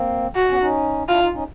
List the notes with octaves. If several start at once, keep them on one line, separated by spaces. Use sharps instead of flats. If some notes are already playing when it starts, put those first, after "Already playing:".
Already playing: A#3 C4
F#4
B3 C#4
C#4 D#4
D4 E4 F4
D#4 F4
C#4 D#4